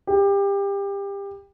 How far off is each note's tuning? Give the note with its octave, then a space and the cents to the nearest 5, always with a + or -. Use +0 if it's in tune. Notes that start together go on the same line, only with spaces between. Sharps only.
G4 +25